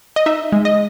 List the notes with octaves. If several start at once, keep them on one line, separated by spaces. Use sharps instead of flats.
D#5
D#4 E5
G#3
D#5